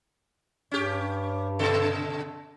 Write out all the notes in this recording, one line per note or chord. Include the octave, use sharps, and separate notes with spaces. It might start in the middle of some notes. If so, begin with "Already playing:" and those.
G2 C#4 G4
B2 D3 A4